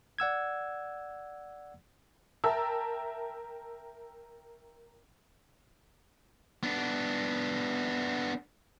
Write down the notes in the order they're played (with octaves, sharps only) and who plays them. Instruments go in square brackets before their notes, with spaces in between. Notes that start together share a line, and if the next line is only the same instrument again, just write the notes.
[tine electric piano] D5 F#5 E6 G#6
[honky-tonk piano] A#4 E5 G5 A5 E6
[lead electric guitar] B3 D4